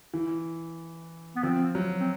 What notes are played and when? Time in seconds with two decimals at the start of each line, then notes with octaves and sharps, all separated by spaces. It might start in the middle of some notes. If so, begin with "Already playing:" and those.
0.14 E3
1.36 B3
1.43 F3 C4
1.75 F#3
2.00 C4